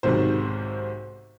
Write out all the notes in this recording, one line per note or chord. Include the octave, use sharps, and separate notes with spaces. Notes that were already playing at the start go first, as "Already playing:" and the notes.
B1 G#2 C3 D#3 C5